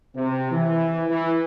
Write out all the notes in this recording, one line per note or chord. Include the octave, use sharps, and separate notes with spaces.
C3
E3
E3